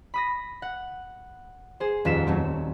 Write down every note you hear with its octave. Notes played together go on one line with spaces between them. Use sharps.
B5 D#6 A#6
F#5
G#4 C5
D#1 F2 F4 B6 E7
F#3 A3 C4